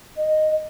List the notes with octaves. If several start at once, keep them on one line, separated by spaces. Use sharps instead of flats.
D#5